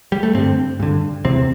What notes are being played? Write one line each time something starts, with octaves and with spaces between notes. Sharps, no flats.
G3
A3
G2 D3 C4
G2 D3
E2 C3 C4